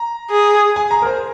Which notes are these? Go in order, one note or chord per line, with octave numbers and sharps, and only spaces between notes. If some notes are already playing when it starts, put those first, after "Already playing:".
Already playing: A#5
G#4
G#5
A#5
A#4
C5